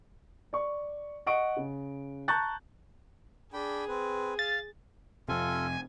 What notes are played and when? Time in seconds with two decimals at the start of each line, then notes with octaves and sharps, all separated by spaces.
0.53 D5 C#6
1.26 D#5 F#5 C#6 D7
1.57 C#3
2.28 A5 A#5 C#6 F#6 G6 A6
3.53 D4 G#4 G5 B5
3.88 C4 B4
4.39 F5 A6
5.28 F2 C3 F4 A4 G#5